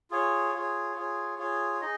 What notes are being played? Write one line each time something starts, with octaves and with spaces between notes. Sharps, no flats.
F4 G#4 C#5
F4 G#4 C#5
F4 G#4 C#5
F4 G#4 C#5
D#4 G#4 D#5